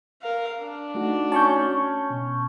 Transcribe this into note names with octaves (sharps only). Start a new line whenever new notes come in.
A#4 F5
D4
A3 D#4 F#4
C#4 A5 C#6 G6
B2